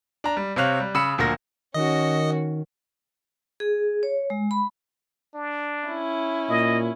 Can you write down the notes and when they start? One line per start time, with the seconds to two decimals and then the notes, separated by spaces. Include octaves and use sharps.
0.24 D4 A#5
0.37 G3
0.56 C3 C4 C#5 F5 F#6 F7
0.80 G3
0.95 C#3 B5 E6 C#7 E7
1.18 D2 A#2 F3 A#4 A#6
1.74 D#3 C#4 F#4 D#5
3.60 G#4
4.03 C#5
4.30 G#3
4.51 B5
5.35 D4
5.87 C#4 E4
6.50 A#2 D#5